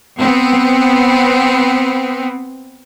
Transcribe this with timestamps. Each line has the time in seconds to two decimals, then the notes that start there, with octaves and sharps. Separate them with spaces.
0.17 B3 C4